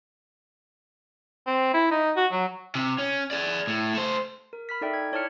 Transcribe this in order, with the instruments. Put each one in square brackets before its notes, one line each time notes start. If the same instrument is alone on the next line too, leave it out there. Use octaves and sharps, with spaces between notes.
[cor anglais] C4
E4
D#4
F#4
F#3
[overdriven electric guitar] C3
C#4
G#4 D5
A2
A3 C5
[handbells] A#4
B5 F6 B6
D#4 A4 D5 E5 G5
G#6
E4 C#5 D5 A5 F6 C#7